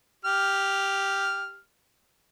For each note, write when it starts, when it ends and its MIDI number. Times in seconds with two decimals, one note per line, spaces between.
0.25 1.59 67
0.25 1.59 89